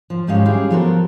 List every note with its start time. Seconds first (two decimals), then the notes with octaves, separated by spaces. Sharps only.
0.10 F3
0.27 G#2 D#3 G3 G#3 C#4 F5
0.45 E4 G4 G#4 F5
0.70 F3 F#3 B3 F#4 A4 A#4